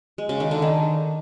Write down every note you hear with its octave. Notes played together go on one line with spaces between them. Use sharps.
G#3
C#3
D#3
D3
D#3